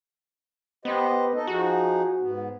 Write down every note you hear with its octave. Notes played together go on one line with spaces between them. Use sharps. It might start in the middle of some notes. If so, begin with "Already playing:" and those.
B3 G4 C5 D#5
D#4 A4 D#5
F3 D#4 F#4 G#4
G#2 B3